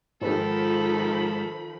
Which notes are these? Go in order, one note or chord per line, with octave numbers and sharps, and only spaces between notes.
G#2 D#3 F3 A4 B5